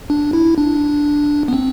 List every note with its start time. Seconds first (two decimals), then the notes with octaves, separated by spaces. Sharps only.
0.10 D4
0.33 E4
0.58 D4
1.48 B3
1.53 C4